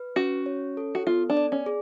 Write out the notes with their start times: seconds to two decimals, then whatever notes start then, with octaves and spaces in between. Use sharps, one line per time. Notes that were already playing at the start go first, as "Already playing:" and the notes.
Already playing: B4
0.16 C#4 F#4
0.46 C#5
0.77 A4
0.95 F#4
1.07 B3 F4
1.30 D4
1.37 D5
1.52 C#4
1.66 G#4